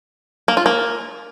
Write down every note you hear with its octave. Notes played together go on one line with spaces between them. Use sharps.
A#3
F4
A#3